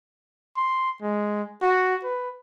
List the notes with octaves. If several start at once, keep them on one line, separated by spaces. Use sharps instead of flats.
C6
G#3
F#4
B4